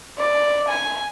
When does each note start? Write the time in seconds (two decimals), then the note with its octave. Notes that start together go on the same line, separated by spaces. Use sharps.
0.18 D5
0.68 G#5